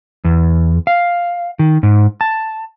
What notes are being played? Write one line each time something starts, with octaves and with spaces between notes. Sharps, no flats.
E2
F5
D#3
G#2
A5